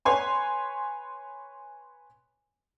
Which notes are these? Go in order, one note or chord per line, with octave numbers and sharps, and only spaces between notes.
B4 C#5 G#5 C6